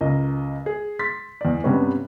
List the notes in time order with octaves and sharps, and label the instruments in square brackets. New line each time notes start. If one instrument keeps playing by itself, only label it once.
[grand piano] C#2 A#4 D#5
G#4
C6 A6 B6
E2 D5
G2 C3 G3 B3 C#4